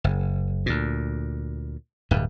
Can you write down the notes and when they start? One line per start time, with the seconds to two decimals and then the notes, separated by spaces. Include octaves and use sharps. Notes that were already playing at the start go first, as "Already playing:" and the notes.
0.04 F#1
0.66 D2 A#2
2.11 D1 G2